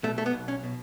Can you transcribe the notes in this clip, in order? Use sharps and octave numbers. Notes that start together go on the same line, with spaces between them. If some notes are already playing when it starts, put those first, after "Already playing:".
B2 A3
A3
B3
B1
C#4
B2